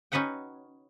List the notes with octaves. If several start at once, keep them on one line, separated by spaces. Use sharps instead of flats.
C#4 D#4 F#4 B4 F#5 G5